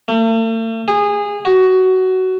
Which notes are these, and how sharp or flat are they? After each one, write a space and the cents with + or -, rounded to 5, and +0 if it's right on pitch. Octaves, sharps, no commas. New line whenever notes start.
A3 +45
G#4 -20
F#4 +15